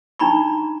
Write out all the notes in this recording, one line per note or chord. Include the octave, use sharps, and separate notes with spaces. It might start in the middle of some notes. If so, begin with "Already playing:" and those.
D4 D#4 A#5 B5 C#6